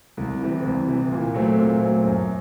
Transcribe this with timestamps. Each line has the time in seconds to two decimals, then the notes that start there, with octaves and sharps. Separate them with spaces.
0.17 C2
0.41 C3 E3
0.64 C2
0.88 C3 E3
1.11 A#2
1.34 F#3 A3 C4
1.58 A#2
1.82 F#3 A3 C4
2.04 F#2